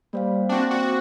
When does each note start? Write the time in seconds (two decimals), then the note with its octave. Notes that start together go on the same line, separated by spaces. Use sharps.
0.13 G3 A#3 C5 F5
0.49 C4 D4 F#4
0.71 F#4